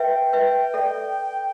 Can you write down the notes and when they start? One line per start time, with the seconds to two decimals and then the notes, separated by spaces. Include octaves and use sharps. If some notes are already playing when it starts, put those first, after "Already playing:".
Already playing: B4 E5 G5
0.33 B4 E5
0.74 A4 D5